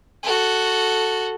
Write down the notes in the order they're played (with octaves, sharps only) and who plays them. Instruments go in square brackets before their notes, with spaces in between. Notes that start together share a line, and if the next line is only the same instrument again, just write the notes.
[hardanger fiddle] F#4 A4